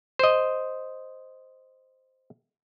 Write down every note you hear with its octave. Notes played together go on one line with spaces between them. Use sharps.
C5 D#5